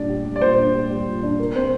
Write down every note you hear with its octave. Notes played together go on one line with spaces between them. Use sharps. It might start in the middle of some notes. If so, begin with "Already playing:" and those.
Already playing: A#2 G3 D4 D5
G4
G3
D5
A#2 C5
D4
G4
G3
A#2
D4
A#4
C4 C5